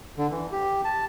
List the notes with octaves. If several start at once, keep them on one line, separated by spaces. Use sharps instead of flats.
D3
E3
G4
A5